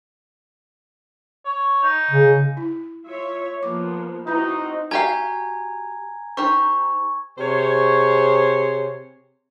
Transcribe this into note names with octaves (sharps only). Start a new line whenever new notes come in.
C#5
D#4
C#3
E4
F4 C#5 E5
F3 A#3 B3 D6
C4 D#4 E4 F#4 B4 E5
F#4 G4 F5 G#5 A#5 G#6
D#4 G4 C5 C#6
C3 G#4 C5 C#5